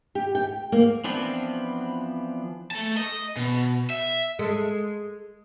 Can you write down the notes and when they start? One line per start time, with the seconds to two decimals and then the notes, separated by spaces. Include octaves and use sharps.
0.15 G4
0.35 G5
0.72 A#3
1.04 E3 F3 B3 C4 D4
2.71 A3 A5
2.97 D#5
3.36 B2
3.90 E5
4.39 G#3 A4